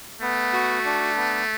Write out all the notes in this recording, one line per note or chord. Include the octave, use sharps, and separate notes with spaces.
A3 B3
F#4
D4
B3